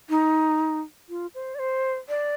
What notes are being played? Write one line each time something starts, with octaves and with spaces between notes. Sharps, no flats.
D#4
F4
C5
D5
C5
D5